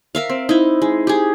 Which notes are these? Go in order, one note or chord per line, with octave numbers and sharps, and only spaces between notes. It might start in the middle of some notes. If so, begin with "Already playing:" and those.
A#4 E5 F5
C4
D#4 E4
G#3
G4 G#4